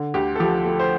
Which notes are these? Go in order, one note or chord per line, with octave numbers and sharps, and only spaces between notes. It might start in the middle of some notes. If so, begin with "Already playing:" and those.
Already playing: D3
D2 G4
A4
F3 G4
A3
C5